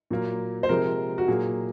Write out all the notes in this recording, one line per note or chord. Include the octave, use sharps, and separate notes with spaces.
A#2 F#3 A#3
C5
C3 F3 G#3 A#4
F#4
A#2 F#3 A#3 G#4